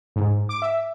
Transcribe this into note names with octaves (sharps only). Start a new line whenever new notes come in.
G#2
D6
E5